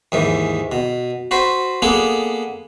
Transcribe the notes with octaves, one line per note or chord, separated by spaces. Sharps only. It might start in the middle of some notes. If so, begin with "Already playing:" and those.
D#2 G#2 E3
B2
F#4 B4 C5
A#3 B3 D4 G#4 A4